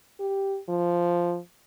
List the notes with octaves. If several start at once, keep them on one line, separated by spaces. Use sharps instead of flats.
G4
F3